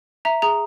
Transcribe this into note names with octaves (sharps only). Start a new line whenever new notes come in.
E5 A#5
G#4 A#5